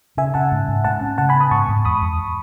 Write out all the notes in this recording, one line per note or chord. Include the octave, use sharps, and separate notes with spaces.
C#3 E5 G#5
C#3 F#5 A5
G#2
G#2
A2 F#5 A5
C#4
C#3 F#5 A5
G#5 B5
B3
B5 D#6
G#2 A5 C#6
G#2
E2 B5 D#6
E2